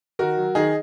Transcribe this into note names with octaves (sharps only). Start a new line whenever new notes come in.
D#3 F#4 A#4
F#3
D#3 D#4 G#4